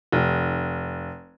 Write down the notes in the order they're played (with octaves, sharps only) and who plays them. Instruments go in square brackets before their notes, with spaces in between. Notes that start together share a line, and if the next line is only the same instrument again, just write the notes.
[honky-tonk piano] F1